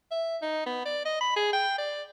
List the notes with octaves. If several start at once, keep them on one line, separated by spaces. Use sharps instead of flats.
E5
D#4
B3
D5
D#5
B5
G#4
G5
D5